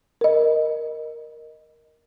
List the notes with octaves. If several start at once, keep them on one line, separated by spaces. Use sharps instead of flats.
A#4 D#5